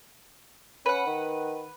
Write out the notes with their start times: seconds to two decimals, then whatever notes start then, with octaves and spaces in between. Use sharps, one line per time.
0.86 C#4 B4 F#5
1.07 D#3